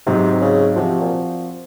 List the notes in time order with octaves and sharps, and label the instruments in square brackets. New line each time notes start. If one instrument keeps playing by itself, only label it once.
[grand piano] G#2 F#3 C4 [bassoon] C3
[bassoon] C#3
[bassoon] C3 [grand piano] F3 C4 F#4
[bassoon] A#2